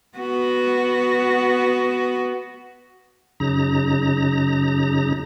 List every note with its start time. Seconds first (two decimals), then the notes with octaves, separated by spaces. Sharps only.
0.17 B3 F#4
3.40 F#2 C#3 D#4 A#5